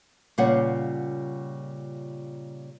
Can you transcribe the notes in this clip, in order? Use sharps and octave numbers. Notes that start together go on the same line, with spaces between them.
A#2 C#3 G3 F4 C#5 F#5